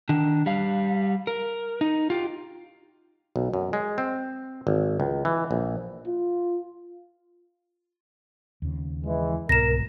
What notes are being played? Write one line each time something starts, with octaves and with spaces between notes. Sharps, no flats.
D#3 D4
G3 F5
A#4
D#4
F4 G4
B1
F#2
G#3
C4
G#1
C#2
E3
A#1
F4
D#2 C#3
E3 G#3
C2 G#2 B2 A#4 A#6 E7